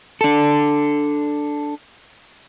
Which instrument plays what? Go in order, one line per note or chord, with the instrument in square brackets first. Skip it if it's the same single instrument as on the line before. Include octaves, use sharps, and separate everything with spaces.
[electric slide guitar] D4 A4